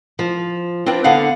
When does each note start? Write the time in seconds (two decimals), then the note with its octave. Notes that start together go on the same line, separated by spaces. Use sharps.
0.19 F3
0.86 C4 D4 F4 B4 G5
1.04 D3 B3 D4 F5 F#5